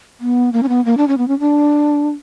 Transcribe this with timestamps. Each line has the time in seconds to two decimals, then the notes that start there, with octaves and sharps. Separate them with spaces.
0.20 B3
0.53 A#3
0.63 C#4
0.69 B3
0.85 A#3
0.97 D4
1.08 C#4
1.18 B3
1.28 C#4
1.40 D4